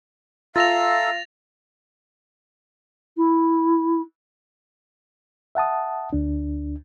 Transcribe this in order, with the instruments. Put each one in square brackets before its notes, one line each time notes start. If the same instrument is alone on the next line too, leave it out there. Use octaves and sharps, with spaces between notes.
[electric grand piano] F4 [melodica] A4 E5 A#5 [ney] F5 [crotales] A6 A#6 F7
[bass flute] E4
[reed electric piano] E5 F#5 A5 D#6
D2 D4